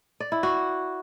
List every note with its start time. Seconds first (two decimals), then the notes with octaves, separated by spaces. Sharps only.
0.20 D5
0.32 E4
0.43 F#4